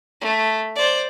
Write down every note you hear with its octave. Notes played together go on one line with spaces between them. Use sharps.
A3
C5 D5